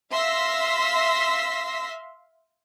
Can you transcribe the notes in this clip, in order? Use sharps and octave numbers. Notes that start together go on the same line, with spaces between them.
E5 F5 C6 E6 A#6 B6